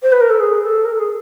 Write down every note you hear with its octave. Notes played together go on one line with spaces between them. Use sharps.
C5
B4
A#4
A4
G#4
A4
A#4
A4
G#4